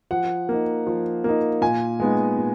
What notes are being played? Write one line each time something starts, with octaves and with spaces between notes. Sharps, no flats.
F3 F#5
A#3 D#4
F3
A#3 D#4
A#2 G#5
G#3 B3 D#4
A#2